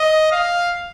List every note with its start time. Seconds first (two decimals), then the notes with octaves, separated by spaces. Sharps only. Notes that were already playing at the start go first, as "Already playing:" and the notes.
Already playing: D#5
0.32 F5